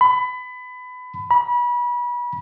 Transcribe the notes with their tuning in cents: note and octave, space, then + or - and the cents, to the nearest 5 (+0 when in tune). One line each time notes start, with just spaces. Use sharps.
B5 +25
B5 -30